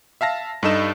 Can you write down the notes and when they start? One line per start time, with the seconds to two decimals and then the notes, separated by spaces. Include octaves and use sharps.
0.21 E5 F5 A5 A#6
0.63 G2 G3 D#4 A4 D#5 E7